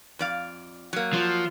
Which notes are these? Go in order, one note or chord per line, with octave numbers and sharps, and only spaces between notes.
F2 D5 F5
F#3 A#3
F3